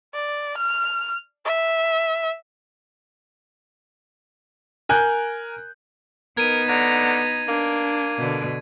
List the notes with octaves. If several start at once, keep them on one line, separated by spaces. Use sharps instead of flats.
D5
F6
E5
A#4 G#5 F#6 G6
B3 D#4 A#4 G#6 D#7
D3 A#5
A#3 D4
B2 D3